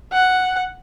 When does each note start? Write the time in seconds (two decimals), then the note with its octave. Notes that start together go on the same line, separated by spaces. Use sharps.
0.12 F#5